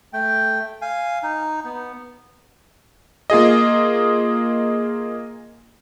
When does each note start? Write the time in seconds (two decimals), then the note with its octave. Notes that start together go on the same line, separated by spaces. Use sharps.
0.13 A3 G5
0.82 F5 G#5
1.23 D#4
1.64 B3
3.30 A#3 F4 G#4 D#5